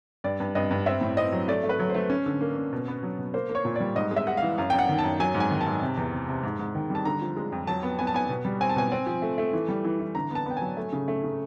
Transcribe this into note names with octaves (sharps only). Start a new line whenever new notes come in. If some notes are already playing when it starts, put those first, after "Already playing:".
G2 D5
G2
G2 D#5
G2
C4 E5
A2
C4 D#5
F#3
A3 D5
A3
B4
F#3
A3 C5
C#4
D3
A#3
C#4
B2
B3
F#3
B2
A#3 C5
A#3
C#5
A#2
G3 D5
G#2 D#5
G#3
E5
G#3 F#5
F5
E3
F#2 F5
F#2 G5
F#5
D#3
A5
F#2
F#3 G#5
G#2
G#5
D#3
A5
G#2
C3
E2
C3
C3
G#2
G#2
D#3
G3
A5
D3 A#5
F3
G#3
F2
F#3 A5
B3
B3 G#5
A5
B3 G#5
B2
G3
C4 G#5
A5
B2 G#5
C4
F3
A3
A3
E3
G3
E3
E3
D3 A#5
B3 A5
B3 G5
F#3 G#5
A3
C#3
A3
C#3